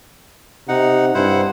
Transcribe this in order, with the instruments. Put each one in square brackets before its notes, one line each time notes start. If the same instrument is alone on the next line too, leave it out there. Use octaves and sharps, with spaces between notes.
[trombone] C3 [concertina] D#4 F#5
[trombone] G2 [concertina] E4 C5 F#5